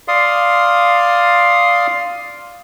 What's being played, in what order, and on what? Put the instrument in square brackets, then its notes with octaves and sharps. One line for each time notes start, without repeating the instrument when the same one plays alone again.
[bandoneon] D5 F5 C6 D#6